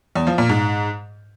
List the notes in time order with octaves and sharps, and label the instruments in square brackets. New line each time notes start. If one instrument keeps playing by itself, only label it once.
[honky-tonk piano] E2
F3
A#2
G#2